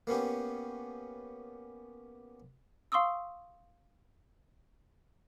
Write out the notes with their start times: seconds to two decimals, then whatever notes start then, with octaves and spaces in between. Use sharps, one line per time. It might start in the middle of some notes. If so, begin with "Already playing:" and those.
0.07 A#3 B3 C#4 G4
2.92 F5 C6 C#6 D#6 E6